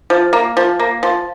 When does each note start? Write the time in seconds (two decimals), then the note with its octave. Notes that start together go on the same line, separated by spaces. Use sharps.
0.10 F3
0.33 A#3
0.57 F3
0.79 A#3
1.03 F3